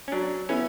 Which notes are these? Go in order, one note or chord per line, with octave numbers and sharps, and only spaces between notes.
C#4
F#3 D4
B3 C#4 E4